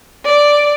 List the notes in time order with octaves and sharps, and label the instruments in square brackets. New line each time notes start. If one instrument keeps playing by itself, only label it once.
[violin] D5